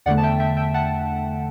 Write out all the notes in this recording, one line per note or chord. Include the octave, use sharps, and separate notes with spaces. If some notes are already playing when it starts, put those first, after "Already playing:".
E2 D3 A3 D5 F#5
A5
E5 G5
E5 G5
E5 G5
F#5 A5